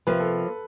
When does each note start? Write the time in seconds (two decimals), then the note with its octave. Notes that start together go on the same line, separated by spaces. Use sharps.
0.07 C3 F3 A#3 B4
0.20 A4